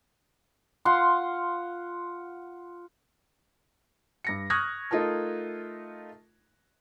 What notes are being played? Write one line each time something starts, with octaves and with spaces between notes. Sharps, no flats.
F4 F5 F#5 C6
G2 A#6 C#7
C#6 D#6 F6 F#6 G#6 A#6
A3 D#4 F4 A#4 A5